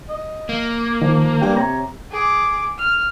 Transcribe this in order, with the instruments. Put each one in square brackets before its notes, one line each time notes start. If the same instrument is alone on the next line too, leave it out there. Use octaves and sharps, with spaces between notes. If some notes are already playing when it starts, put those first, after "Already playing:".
[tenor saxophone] D#5
[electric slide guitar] A#3
[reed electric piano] D#3 [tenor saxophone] F3
[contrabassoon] G2 [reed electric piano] G5
[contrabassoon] C3 [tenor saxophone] C#5 [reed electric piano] A#5
[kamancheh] G#4 D6
F6